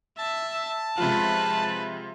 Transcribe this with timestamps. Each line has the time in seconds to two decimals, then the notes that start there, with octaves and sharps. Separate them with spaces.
0.18 E5 A5
0.98 C3 F3 G#3 F4 B4